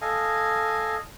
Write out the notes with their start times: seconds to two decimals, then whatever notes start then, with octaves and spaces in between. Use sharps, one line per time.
0.02 A4 D#5 F5 G#5